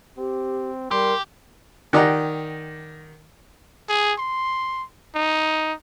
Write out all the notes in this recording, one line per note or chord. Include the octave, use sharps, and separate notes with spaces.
C4 G4
G3 G4 A#4 C6
D#3 G4 D5 D#5 F#5 A#5
G#4
C6
D#4